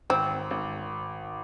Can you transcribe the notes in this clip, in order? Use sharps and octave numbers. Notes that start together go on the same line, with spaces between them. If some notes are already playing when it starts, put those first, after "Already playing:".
G#1 C4
G#1